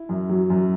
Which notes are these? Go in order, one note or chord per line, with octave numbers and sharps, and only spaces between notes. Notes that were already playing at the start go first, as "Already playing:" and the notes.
Already playing: E4
F#2
F#3
F#2